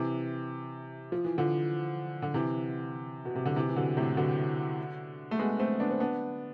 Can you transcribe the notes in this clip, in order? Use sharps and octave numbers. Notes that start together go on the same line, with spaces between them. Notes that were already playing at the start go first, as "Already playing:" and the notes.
Already playing: C3 E3
F3
E3
D3 F3
D3
C3 E3
B2
C3
D3
C3 E3
E3
B2 D3
A2 C3
B2 D3
A3
G#3 B3
A3 C4
B3 D4
C4
B3 D4